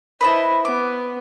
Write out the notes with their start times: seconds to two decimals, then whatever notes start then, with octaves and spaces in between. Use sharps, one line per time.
0.21 E4 B4 C5 D#5 A5
0.65 B3 D6